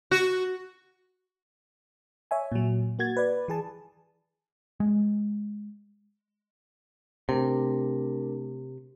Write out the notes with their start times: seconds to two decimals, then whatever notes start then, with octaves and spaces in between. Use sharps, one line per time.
0.11 F#4
2.31 C#5 E5 G#5
2.52 A#2 F#3
2.99 A#3 F#4 G#6 A6
3.17 B4 D5
3.48 E3 G#4 A5
4.80 G#3
7.29 C3 A3 D4 A#4